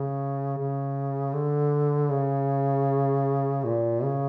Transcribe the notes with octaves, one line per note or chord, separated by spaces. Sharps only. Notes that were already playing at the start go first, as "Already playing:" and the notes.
Already playing: C#3
C#3
D3
C#3
A#2
C#3